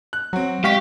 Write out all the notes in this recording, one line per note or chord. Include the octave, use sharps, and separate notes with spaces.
F#6
F#3 C4 F#4
G#3 G4 F5 C#6 B6